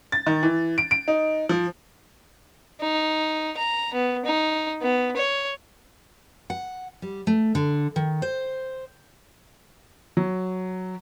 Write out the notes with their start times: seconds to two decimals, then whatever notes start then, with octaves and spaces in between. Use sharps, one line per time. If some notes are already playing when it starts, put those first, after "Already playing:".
0.12 A6
0.27 D#3
0.43 E3
0.78 D7
0.91 D7
1.08 D#4
1.49 F3
2.81 D#4
3.57 A#5
3.93 B3
4.25 D#4
4.82 B3
5.17 C#5
6.50 F#5
7.02 G3
7.27 A3
7.55 D3
7.96 D#3
8.22 C5
10.17 F#3